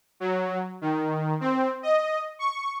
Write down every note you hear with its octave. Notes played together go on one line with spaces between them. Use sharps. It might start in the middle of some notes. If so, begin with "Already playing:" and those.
F#3
D#3
C4
D#5
C#6